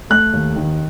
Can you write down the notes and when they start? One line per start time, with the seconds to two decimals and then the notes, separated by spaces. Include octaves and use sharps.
0.10 A3 F#6
0.33 D#2
0.56 D#3